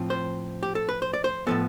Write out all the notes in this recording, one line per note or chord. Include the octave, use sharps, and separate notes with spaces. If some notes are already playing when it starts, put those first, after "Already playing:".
Already playing: A2 F3 C4
C5
G4
A4
B4
C5
D5
C5
A2 F3 B3 A4